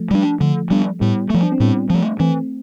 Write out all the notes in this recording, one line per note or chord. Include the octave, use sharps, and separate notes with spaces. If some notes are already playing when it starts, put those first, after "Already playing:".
Already playing: F3 A3
G3 B3 D4
D3 F3 A3
G3 B3 D4
A2 G3 B3
F3 A3
D4
C4
A2 G3 B3
F3 A3
E3 A3 C4